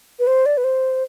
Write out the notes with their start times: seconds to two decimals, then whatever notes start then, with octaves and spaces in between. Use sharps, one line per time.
0.19 B4
0.27 C5
0.46 D5
0.57 B4
0.64 C5